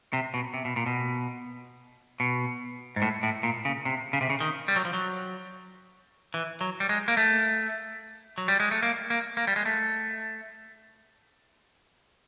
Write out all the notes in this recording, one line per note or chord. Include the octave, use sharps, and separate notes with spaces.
C3
B2
C3
B2
A#2
B2
B2
G#2
A2
A2
A#2
C#3
C3
C#3
C3
C#3
D#3
G3
F#3
F3
F#3
E3
F#3
G3
G#3
A#3
A3
F#3
G3
G#3
A3
A#3
A#3
A#3
G3
G#3
A3